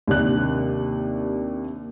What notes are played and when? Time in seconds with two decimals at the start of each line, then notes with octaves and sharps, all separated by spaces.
0.07 D#2 C3 D4 F#6